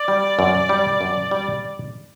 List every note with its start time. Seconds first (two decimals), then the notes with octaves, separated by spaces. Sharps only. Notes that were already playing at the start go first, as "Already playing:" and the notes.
Already playing: D5
0.08 G3
0.39 F#2
0.69 G3
1.01 F#2
1.31 G3